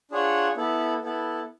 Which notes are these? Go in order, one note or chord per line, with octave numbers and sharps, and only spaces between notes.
D4 F4 G#4 C#5 F#5
B3 E4 A4
B3 E4 A4